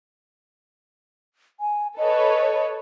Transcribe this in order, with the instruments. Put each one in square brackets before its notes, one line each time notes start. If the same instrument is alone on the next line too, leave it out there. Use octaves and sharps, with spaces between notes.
[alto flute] G#5
[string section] A4 B4 C#5 [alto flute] D#5